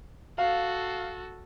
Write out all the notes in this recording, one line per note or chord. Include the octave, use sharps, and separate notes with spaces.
F#4 A4 F5